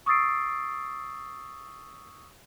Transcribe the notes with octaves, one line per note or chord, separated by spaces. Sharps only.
C#6 D#6 E6 A6 C7 D7